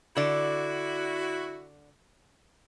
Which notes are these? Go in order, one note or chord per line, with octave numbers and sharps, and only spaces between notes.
D3 E4 F#4 D5